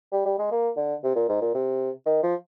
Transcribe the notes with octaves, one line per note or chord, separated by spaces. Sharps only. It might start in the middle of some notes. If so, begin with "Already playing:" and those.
G3
G3
G#3
A#3
D3
C3
A#2
G#2
A#2
C3
D#3
F3